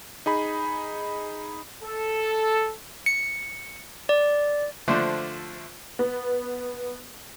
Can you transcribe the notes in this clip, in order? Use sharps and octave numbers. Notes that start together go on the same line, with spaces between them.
D#4 G#4 B5
A4
C#7
D5
D3 F3 A3 D4 C5
B3